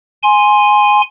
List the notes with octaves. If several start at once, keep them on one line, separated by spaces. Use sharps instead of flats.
G#5 C6